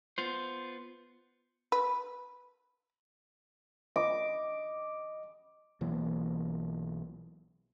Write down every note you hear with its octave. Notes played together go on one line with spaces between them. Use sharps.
B3 F4 C5
B4
D#5 D6
B1 E3 A#3